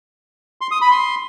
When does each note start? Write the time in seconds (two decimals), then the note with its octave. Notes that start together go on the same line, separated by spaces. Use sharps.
0.61 C6
0.71 D#6
0.81 B5
0.91 C6